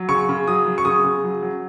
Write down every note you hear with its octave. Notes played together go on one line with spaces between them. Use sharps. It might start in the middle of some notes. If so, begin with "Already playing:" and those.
Already playing: F#3
C#3 C#6
C#3
F#3 D#6
F#3
C#6
C#3 D#6
C#3
F#3
F#3